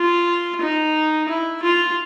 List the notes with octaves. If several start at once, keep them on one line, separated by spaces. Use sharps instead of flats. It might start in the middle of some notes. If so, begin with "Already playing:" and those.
Already playing: F4
D#4
E4
F4